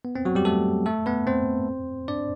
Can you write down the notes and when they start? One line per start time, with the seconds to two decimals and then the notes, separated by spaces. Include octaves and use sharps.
0.05 B3
0.15 C4
0.25 F#3 F#4
0.35 G3 G4
0.45 A3 A4
0.86 A3 A4
1.06 B3 B4
1.27 C4 C5
2.08 D4 D5